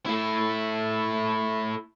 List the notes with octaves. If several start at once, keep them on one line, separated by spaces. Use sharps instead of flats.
A3 E4